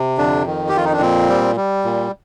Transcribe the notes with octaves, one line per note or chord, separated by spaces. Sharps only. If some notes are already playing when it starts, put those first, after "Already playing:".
Already playing: C3
F2 D3 D4
D#3
G4
F2 F4
D#4
D4
A#2 C4
G3
G3
A#2